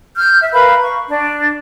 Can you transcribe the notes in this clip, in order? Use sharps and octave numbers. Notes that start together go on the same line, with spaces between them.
F6 G6
E5
A#4 B4 F5 B5
C#6
D4